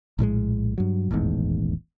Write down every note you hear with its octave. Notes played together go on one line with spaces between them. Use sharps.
A#1 A2 G3 G#3
G2 F#3
D#1 A1 E2 G#2